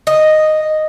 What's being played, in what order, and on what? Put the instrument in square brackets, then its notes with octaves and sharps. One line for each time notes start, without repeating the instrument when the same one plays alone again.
[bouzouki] D#5